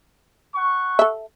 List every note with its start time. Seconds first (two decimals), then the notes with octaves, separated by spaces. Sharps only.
0.55 F#5 C#6
0.99 A4 E5